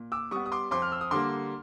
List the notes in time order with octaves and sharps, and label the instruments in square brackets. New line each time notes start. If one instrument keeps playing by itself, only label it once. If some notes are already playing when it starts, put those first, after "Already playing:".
Already playing: [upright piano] A#2
D6 E6
G3 B3 C#6 D#6
D#6
C6 D6
F2 C6 D6
F6
E6
D#6
D3 G3 A#3 C6 D6